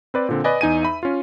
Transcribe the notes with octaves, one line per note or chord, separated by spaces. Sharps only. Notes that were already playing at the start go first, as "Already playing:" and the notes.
C4 B4 D5
A#2 D3 C4
B4 D5 D#5 G#5
E2 D#4 G#5 D#7
E5 B5
C#4 F4